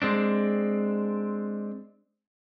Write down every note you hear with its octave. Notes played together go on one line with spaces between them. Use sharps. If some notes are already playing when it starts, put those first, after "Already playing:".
G#3 C4 D4